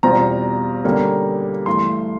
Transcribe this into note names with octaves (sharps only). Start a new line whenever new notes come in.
E2 B2 G3 C4 F4 A#5
D3 G3 A#3 C#4
G2 E3 A3 C6